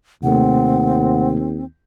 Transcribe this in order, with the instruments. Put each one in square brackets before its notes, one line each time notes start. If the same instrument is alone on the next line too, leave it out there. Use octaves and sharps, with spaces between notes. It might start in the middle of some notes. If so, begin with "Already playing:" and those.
[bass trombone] D#2 [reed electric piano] C3 A3 [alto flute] C4 [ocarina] F#5